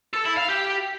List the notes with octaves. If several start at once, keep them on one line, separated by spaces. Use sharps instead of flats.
A4
E4
F5
G4